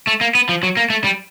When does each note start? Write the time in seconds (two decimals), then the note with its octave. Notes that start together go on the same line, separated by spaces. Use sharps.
0.07 A3
0.21 A#3
0.35 B3
0.49 F3
0.63 F#3
0.77 A#3
0.90 A3
1.04 G3